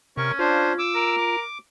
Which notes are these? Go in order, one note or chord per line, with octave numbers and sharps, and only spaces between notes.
C3 C#4 A#4 C#6
D4 F4 C5
D6 E6
A#4
D6